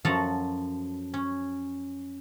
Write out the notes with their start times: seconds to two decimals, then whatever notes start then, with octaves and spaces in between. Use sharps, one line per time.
0.05 F#2 F3 F#4 A4 F5 F#5
1.14 C#4